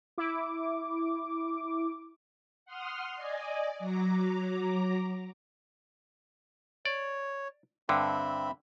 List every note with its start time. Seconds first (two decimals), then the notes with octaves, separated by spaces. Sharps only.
0.18 E4 D6
2.65 F#5 C6 D#6 F6
3.16 D5 D#5 G#5
3.79 F#3 A#5 D6
6.85 C#5 D5
7.89 G2 D3 C4 E5 B5